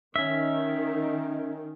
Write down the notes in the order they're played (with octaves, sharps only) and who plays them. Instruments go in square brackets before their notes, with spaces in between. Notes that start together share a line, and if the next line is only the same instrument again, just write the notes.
[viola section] D#3 [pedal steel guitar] C#4 E5